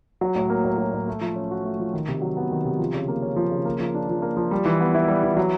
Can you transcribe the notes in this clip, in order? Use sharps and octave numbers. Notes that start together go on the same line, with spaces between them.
F#3
A2
A#3
A2
F#3
A2
A3
F3
C#4
F#4
A3
F3
D#3
C3
F#3
B3
D#3
C3
F3
C#3
A#3
C#4
F3
C#3
A#3
F3
D4
F3
A#3
F3
G3
E3
B3
E4
G3
E3
F#3